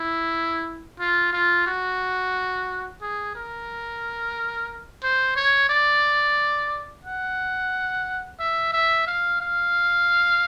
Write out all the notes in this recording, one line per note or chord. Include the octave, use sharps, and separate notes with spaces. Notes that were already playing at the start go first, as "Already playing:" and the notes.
Already playing: E4
F4
F4
F#4
G#4
A#4
C5
C#5
D5
F#5
E5
E5
F5
F5